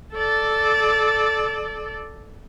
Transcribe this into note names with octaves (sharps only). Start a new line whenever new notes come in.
A4 D5